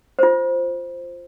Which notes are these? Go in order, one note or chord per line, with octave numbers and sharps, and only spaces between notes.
F4 C5